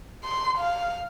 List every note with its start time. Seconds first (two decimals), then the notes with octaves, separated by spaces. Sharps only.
0.24 C6
0.58 F5